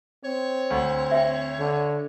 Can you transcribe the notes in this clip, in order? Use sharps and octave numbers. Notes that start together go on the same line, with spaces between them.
C4 C#5
D2
E5 G5
D3